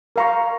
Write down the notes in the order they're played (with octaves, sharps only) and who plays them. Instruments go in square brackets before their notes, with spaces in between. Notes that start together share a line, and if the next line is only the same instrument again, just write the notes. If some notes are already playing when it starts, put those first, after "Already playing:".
[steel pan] A#4 F5 A#5 C#6